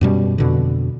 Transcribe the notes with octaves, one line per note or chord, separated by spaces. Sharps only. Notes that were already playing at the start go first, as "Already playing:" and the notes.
F#2 B2 G3
F2 B2 D3